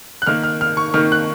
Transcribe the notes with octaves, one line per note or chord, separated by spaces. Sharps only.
F#6
D#3 A#3 F6
F6
F6
C#6
D#3 A#3 F6
F#6